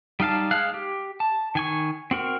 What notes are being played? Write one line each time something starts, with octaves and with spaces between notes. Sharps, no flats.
G3 D#4 F5 A5
G#3 F5 F#6
G4
A5
D#3 G#5 C#6
C4 F#4 A#4